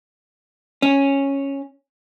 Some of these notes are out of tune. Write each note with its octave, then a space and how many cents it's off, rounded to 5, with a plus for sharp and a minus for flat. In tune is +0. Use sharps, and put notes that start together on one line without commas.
C#4 -5